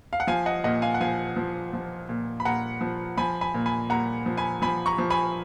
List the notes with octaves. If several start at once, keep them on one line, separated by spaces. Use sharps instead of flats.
F5
F#5
F3 F5 G#5
D#5 F#5
A#2 D#5 F#5
F5 G#5
F#5
F3 F5 G#5
F3
F3
A#2
B5
A#2 F#5 A#5
F3
F3 G#5 B5
G#5 B5
A#2
G#5 B5
A#2 F#5 A#5
F3
G#5 B5
F3 G#5 B5
A#5 C#6
F3
G#5 B5